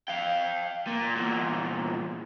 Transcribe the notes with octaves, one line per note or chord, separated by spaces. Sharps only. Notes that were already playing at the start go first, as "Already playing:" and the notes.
F5 G5
A#2
E2 A#2